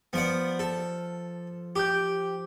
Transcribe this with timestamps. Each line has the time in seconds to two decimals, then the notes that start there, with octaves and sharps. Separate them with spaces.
0.13 F3 B3 D5 F#5
0.59 A4
1.76 G4 D6 G6